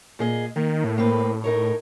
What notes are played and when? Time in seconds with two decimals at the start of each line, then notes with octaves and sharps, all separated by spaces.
0.19 A#2 G#4 D#5
0.56 D#3 A#3
0.84 A2
0.98 A#3 C4 B4
1.44 D#4 A#4 C#5